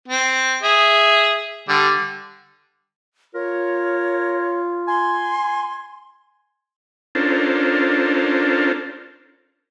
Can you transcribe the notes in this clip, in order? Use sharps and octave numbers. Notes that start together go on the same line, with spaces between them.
C4
G#4 E5
D3 G3
F4 A#4 C#5
G#5 C6
C#4 D4 F4 A4 A#4 C5